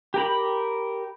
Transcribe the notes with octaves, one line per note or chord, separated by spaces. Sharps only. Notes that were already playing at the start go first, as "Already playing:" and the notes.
G4 A#4 B5